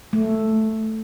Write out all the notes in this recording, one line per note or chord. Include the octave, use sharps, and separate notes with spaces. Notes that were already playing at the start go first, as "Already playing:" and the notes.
A3